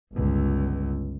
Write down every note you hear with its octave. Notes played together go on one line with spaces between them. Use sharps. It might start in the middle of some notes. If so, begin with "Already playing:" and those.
G1 C#2